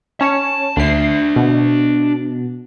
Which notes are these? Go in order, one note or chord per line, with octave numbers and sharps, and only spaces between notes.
C#4 C#5 A5
D2 D4 E5 C7
B2